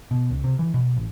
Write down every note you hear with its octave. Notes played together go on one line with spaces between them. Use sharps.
B2
C#2
C3
E3
B2
A1